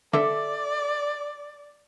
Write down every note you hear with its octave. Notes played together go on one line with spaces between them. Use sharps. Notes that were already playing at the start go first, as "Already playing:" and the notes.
D3 A4 D5 E5 D6